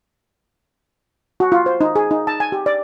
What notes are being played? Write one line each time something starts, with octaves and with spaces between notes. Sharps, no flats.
F#4
F4
C5
D#4
G#4
D#4
A5
G#5
G4
D5